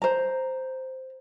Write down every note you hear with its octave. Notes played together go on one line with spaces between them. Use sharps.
C5 A#5